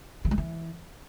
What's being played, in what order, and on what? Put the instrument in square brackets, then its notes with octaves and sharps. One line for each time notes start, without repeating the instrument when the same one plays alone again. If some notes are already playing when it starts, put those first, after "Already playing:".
[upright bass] E3
G3
E3